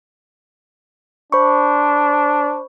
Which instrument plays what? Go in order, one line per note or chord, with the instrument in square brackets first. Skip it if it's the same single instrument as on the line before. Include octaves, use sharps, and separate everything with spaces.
[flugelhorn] D4 [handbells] C5 B5 C#6